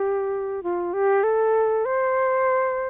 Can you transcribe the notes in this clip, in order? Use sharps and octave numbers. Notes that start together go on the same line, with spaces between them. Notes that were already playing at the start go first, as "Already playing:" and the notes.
Already playing: G4
F4
G4
A4
C5